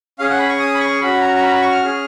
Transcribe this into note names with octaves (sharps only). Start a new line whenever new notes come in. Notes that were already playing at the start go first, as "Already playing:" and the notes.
C#4 G#4 F5
F#5
B5
C#6
D#6
B5
C#6
C#4 F#4 B5
A#5
A#5
B5
A#5
B5
C#6
F6
C#4 G#4